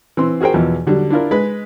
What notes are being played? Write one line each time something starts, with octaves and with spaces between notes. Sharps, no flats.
E3 C4 C6
F#4 G#4 A#4 C5 G5
E2 B2 E3 F3 B3
D3 F#3 G3 D4
D4 E4 F4 A#4
G#3 B4 B5